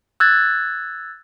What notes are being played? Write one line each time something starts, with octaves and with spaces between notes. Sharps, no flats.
E6 F#6 G#6 A6